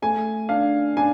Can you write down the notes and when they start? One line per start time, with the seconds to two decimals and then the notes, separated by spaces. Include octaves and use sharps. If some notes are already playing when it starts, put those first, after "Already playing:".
0.02 A3 G#5
0.49 D4 F5
0.97 D4 G#5